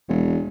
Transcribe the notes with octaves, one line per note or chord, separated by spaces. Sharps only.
E1